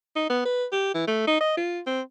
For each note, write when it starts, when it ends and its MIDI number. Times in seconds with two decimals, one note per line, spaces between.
0.16 0.25 63
0.30 0.41 59
0.45 0.66 71
0.72 0.90 67
0.94 1.04 52
1.07 1.27 57
1.27 1.40 63
1.41 1.54 75
1.57 1.80 65
1.86 2.01 60